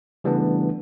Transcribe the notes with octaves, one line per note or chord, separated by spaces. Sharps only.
C#3 E3 G3 A3 B3 D4